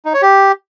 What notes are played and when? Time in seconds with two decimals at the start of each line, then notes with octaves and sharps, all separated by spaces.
0.05 D#4
0.14 C#5
0.22 G4